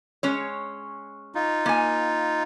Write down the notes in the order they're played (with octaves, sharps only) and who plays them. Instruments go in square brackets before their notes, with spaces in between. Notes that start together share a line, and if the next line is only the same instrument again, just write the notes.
[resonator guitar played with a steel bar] G#3 C#4 C#5
[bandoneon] D#4 F4
[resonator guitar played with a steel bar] A#3 G#5